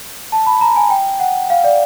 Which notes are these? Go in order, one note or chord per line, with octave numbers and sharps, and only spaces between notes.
A5
B5
A#5
G#5
G5
F#5
F5
D5